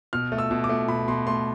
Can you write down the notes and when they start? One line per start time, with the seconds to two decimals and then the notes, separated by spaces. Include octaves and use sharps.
0.13 B2 F6
0.32 A3
0.38 E6
0.51 B2
0.64 D6
0.69 A3
0.88 B2 B5
1.08 B2 C6
1.27 A3 C6